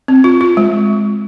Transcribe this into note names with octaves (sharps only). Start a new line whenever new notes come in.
C4
F4
F4
G#3